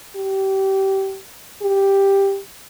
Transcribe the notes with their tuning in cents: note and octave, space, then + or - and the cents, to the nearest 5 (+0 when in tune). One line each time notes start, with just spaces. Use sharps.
G4 -25
G4 +5